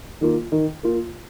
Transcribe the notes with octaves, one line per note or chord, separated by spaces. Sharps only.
D#3 A#3 F4
D#3
A#3 F4